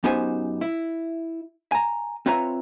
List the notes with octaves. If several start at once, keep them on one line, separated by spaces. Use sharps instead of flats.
F#2 B3 D#4 G4 C5 G#5
E4
G#5 A#5
C4 F4 B4 C#5 E5 A#5